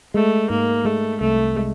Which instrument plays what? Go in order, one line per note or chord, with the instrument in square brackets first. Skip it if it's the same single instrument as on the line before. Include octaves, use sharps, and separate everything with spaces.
[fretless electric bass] G#3 [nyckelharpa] A3
[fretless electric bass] G#2 [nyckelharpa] A#3
[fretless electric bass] G#3 [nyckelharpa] A3
[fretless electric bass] C2 [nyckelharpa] A3
[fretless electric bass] G#3